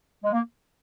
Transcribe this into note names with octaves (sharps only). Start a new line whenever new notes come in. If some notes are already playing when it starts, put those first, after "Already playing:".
G#3
A#3